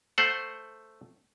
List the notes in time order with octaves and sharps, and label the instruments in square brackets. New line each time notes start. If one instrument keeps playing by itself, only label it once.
[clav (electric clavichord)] A3 C5 F#5